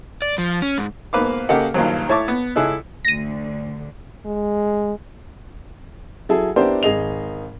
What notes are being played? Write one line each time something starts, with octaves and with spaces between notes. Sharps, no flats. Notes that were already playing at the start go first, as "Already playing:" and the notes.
D5
F3
C#4
G#2
G#2 B2 A#3 B4 F5 D6
C#3 A#3 G4 A4 D#5 F#5
G2 A#2 D#3 F3 F#3
A2 C#5 E5 A5 C#6 D6
B3
C#2 E4 G#4 A4 D#5 F#6
D2 D3 A#6 D#7
G#3
F#3 E4 G#4 A4
B3 D4 E4 G4 A#4 C5
G#1 G#4 D#5 F7